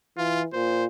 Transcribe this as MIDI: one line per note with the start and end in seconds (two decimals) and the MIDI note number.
0.17 0.47 52
0.17 0.41 65
0.53 0.86 46
0.53 0.84 72